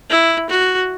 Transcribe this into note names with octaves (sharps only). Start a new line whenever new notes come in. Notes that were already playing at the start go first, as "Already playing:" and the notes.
E4
F#4